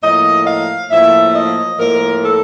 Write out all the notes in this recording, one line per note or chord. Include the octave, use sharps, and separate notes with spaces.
A2 F3 A#3 D#5
F5
A2 F3 A#3 E5
D#5
A2 F3 A#3 A#4
A4